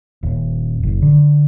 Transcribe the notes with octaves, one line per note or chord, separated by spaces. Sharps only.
D#1
F#1
D3